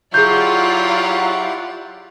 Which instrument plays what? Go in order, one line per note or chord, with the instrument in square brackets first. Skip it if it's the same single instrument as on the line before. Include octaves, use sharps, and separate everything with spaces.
[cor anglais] F#3 [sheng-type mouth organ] E4 G4 F#5 [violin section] F4 D5 [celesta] G#4 G6